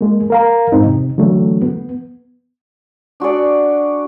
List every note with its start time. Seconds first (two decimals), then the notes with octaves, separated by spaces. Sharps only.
0.01 G#3 A#3
0.30 A#4 F5 A#5
0.72 F2 G#2 C4 D#4
0.86 C3
1.18 D3 E3 F#3 A3
1.62 B3
3.20 D4 F#4 G#4 D5